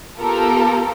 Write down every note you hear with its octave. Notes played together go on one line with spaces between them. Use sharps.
B3 F4 G4 A4 A#4